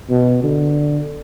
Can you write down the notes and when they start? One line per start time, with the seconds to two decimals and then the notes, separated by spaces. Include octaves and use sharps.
0.10 B2
0.43 D3